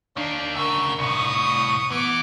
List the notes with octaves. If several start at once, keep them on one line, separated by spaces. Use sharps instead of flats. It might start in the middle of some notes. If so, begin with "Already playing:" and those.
D#3 A#3 D4
D2 C#3 A#4 E6
C2 A2 C#6 D#6
E3 B3 D6